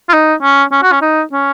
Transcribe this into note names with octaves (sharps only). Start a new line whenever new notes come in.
F4
D#4
C#4
C#4
F#4
C#4
D#4
C#4